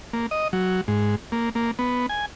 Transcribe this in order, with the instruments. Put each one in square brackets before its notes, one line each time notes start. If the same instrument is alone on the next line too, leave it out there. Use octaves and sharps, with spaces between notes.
[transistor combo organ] A#3
D#5
F#3
G#2
A#3
A#3
B3
G#5